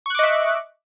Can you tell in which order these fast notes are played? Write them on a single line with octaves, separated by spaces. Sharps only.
C#6 F#6 D6 D#5 E5